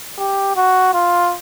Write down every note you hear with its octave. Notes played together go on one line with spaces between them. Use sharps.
G4
F#4
F4